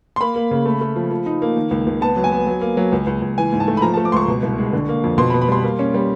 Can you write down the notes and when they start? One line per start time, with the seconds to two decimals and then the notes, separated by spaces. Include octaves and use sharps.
0.16 C6
0.21 A#3 B5
0.36 A#3
0.51 C#3
0.65 A3
0.81 A3
0.96 F3
1.10 F3
1.26 D#4
1.42 A#3
1.57 D#3
1.71 C#2
1.86 C#2
2.01 B3 A5
2.17 F#3
2.24 G#5
2.32 B3
2.46 F#3
2.61 A#3
2.77 F#3
2.92 C#2
3.07 C#2
3.22 C#2
3.38 E3 G#5
3.52 G#2
3.60 A5
3.68 A3
3.77 B5
3.82 F3 A#5
3.94 A5
3.97 A3
4.05 D6
4.12 C#2 C6 C#6
4.28 B2
4.43 C2
4.58 G#3
4.73 D3
4.89 A#3
5.04 F2
5.18 B2 C6
5.30 B5
5.34 B2
5.42 B5
5.48 G3 C6
5.64 A#3
5.79 C#4
5.94 G3